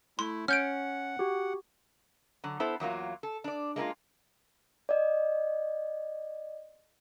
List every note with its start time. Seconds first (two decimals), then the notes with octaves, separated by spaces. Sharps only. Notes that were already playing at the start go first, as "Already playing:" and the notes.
0.19 A3 E4 C6
0.48 C#4 F#5 F6 G6 D7
1.19 F#4 G4
2.44 D3 F#3
2.60 B3 E4 A4 C5
2.80 E2 F#3 A#3 F4
3.23 A4
3.44 D4 D5
3.76 G#3 A#3 E4 F4
4.89 D5 D#5